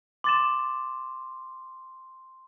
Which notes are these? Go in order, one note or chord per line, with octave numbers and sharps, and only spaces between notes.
C6 D6 A6 E7